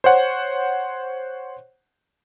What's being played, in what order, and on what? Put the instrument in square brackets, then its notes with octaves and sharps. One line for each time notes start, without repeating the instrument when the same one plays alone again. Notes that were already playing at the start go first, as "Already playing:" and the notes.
[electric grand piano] C5 C#5 F#5